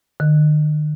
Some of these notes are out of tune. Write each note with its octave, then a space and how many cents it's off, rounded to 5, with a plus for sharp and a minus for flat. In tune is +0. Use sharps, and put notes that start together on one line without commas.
D#3 -45